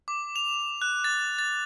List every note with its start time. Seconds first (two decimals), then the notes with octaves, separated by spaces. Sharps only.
0.08 D6
0.36 F7
0.82 F#6
1.04 A6
1.39 A6